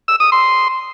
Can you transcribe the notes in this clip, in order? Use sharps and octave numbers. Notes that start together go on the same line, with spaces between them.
E6
D#6
C6